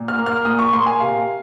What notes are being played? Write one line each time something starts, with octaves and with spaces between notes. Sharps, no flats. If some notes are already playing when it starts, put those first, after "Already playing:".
Already playing: A#2
F6
A#3
F6
A#2 D#6
C#6
A#3 C6
G#5
C3 F5